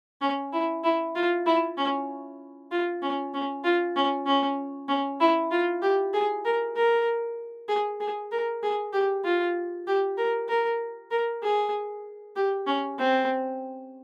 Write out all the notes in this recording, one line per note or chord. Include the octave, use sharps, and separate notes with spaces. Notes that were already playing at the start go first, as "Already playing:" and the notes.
C#4
E4
E4
F4
E4
C#4
F4
C#4
C#4
F4
C#4
C#4
C#4
E4
F4
G4
G#4
A#4
A#4
G#4
G#4
A#4
G#4
G4
F4
G4
A#4
A#4
A#4
G#4
G4
C#4
C4